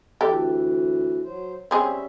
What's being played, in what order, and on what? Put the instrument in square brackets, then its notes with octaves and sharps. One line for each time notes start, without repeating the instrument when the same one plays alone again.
[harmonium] D2 E3 [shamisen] G4 A4
[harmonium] F#3 C5
[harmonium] G3 C#4 E5 [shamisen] C4 G#4